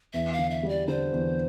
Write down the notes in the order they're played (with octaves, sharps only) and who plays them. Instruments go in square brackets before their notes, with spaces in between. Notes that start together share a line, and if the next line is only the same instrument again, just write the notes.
[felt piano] E2 [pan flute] E5
[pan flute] F5
[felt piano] D3
[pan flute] E5
[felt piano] G3
[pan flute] D5
[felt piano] D3 [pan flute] C5
[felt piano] E2